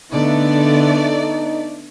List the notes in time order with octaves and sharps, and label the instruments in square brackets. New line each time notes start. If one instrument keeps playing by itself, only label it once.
[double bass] D3 [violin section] A3 D5 [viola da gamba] B3 D4 [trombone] D#4